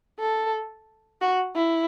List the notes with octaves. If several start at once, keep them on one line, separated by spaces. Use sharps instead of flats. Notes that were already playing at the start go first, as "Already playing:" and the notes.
A4
F#4
E4